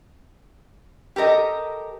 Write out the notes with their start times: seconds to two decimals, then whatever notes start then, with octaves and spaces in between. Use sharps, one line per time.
1.16 G4 A4 A#4 D#5